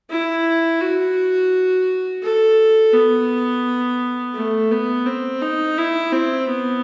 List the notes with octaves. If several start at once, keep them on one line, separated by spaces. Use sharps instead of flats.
E4
F#4
A4
B3
A3
B3
C4
D#4
E4
C4
B3